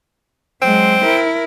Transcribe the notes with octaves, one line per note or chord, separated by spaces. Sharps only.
F#3 G#3 C4
E4 A#4